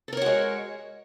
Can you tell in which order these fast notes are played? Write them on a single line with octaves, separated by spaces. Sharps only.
A4 A#4 C#5 F#4 G#3